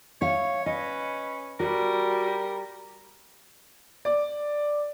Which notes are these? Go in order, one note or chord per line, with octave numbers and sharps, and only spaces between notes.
C#5 E5 F5
C#4 B4 D#5
G3 F#4 A#4
D5